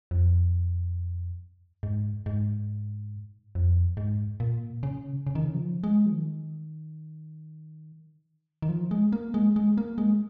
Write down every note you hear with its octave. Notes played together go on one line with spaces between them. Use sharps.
F2
G#2
G#2
F2
G#2
A#2
C#3
C#3
D#3
C#3
F3
G#3
F3
D#3
D#3
F3
G#3
A#3
G#3
G#3
A#3
G#3